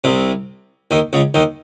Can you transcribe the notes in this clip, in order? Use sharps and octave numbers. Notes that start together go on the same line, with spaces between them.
C2 C3
D#2 D#3
C#2 C#3
D#2 D#3